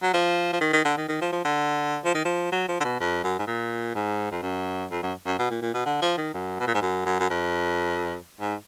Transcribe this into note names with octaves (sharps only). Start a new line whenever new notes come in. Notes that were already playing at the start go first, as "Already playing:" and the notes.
F#3
F3
F3
D#3
D#3
D3
D#3
D#3
F3
F3
D3
F3
D#3
F3
F#3
F3
D3
B2
F2
F#2
G#2
A#2
G#2
F2
F#2
F2
F#2
F#2
B2
A#2
A#2
B2
D3
F3
D#3
F#2
B2
A#2
G#2
F#2
F#2
F#2
F2
G#2